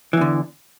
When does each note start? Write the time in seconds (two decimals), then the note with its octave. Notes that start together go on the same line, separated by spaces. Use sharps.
0.13 E3
0.17 E2
0.21 D3